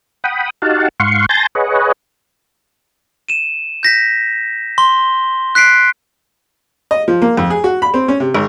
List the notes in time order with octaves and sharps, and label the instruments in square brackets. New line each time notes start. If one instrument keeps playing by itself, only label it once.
[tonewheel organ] F#5 G5 B5 D#6
D#4 F#4 G4 F5 F#5 A5
G#2 F5 F#5 C6 C#6
G#5 A5 C6 G6 A6 A#6
G#4 B4 C#5 D#5 F#5
[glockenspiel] D#7 E7
G6 A#6 B6
C6 G7
F#6 B6 C7 D7
[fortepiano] D#5
F3
A#3
F2
G#4
F#4
B5
C4
C#4
C3
G#1